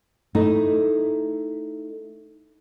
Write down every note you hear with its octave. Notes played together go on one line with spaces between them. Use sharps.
A3 D#4 E4